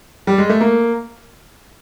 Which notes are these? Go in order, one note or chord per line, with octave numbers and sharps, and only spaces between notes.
G3
G#3
A3
A#3